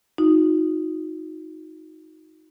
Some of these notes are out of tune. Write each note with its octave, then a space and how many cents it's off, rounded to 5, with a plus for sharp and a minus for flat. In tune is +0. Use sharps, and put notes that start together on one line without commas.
D#4 +15 F#4 -35